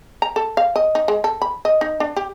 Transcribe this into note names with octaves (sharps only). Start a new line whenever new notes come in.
A#5
A4
F5
D#5
D#4
G#3
A4
B5
D#5
D#4
D4
G4